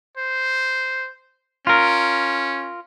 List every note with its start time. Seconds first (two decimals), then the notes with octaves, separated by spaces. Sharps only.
0.17 C5
1.67 C#4 F4 A#4